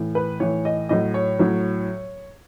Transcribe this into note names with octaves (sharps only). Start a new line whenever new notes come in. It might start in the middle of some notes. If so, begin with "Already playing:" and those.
Already playing: A2 E3
B4
A2 E3 C#5
D#5
A2 F#3 D#5
C#5
A2 F#3